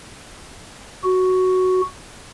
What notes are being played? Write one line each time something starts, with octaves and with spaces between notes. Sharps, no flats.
F#4